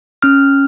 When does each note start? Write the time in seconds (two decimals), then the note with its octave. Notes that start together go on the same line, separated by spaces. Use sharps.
0.22 C#4 F6